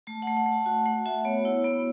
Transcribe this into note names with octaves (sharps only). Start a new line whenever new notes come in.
A3 A5
F#5
A3
F#5
A3
A5
F#4
A3 F#5
F#4 E5
B3 C#5
E4
B3